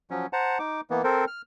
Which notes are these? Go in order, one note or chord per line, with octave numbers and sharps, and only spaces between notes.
F3 F#3 C#4
C5 F#5 A5 A#5
D#4 D6
E3 A#3 B3
C4 A4 A#4 C5
F6